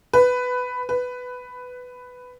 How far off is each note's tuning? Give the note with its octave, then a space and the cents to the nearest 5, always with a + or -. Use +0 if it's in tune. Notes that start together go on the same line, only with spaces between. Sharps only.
B4 +10
B4 +10